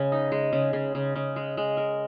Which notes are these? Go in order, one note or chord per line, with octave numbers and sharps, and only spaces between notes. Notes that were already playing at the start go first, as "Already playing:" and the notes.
Already playing: C#3 G#3
D#4
G#3
C#3
C#3
C#3
C#3
G#3
G#3
A#4